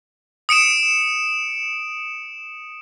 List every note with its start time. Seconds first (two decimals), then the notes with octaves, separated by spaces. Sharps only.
0.49 D#6 C#7 D7 E7